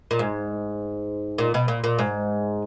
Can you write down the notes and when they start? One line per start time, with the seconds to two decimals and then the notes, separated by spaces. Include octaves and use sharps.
0.11 A#2
0.19 G#2
1.38 A#2
1.54 B2
1.68 A#2
1.84 A#2
1.99 G#2